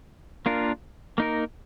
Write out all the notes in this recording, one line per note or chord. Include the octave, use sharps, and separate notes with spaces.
A#3 D4 F4 A#4
A#3 D#4 A#4